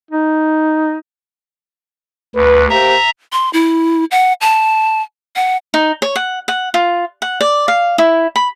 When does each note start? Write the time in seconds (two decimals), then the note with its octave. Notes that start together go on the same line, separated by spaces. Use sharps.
0.11 D#4
2.35 D2 B4
2.70 A#3 G4 C5 E5 A#5
3.32 C6
3.53 E4
4.11 F#5
4.41 A5
5.36 F#5
5.74 D#4
6.02 C#5
6.16 F#5
6.48 F#5
6.74 F4
7.22 F#5
7.41 D5
7.68 F5
7.98 E4
8.36 B5